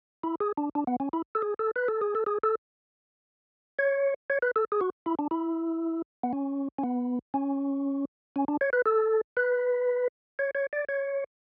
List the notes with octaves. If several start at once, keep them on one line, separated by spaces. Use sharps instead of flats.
E4
G#4
D4
D4
B3
C#4
E4
A4
G#4
A4
B4
A4
G#4
A4
G#4
A4
C#5
C#5
B4
A4
G#4
F#4
E4
D4
E4
B3
C#4
C#4
B3
C#4
C#4
D4
C#5
B4
A4
B4
C#5
C#5
D5
C#5